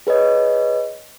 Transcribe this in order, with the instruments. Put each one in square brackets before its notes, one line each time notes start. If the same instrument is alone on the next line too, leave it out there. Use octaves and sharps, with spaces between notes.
[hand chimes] G#4 B4 C#5 D#5